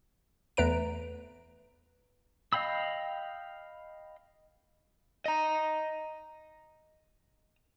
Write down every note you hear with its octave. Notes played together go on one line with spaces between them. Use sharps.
E2 A3 B4 A#5 D7
D#5 F5 G5 B5 E6
D#5 A#5